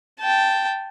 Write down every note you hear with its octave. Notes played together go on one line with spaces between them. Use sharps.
G5 A5